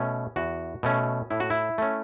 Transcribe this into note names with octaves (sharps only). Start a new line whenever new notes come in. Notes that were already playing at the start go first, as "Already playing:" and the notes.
Already playing: B2 A3 C#4
E2 F#4
B2 A3 C#4
A2 E4
F#4
E4
A3 C#4